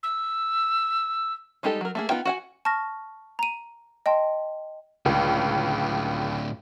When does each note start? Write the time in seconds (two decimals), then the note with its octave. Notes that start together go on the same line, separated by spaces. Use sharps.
0.03 E6
1.63 G3 G#3 D#4 G4 A4
1.81 F#3 A#4
1.95 A3 A#3 G#4
2.09 B3 D#4 F4 G5
2.25 F#4 F#5 G#5
2.65 A5 C#6 F6 A#6
3.39 A#5 D#7
4.06 D#5 G5 A5 C6
5.06 C#2 A2 D3